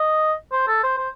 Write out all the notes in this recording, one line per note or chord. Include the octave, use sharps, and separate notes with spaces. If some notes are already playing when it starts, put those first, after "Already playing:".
Already playing: D#5
C5
A4
C5
C5